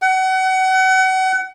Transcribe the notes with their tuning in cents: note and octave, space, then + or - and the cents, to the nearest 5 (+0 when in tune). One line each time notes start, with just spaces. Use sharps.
F#5 +30